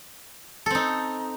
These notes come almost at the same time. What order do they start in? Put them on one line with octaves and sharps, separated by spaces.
A4 C4 D#4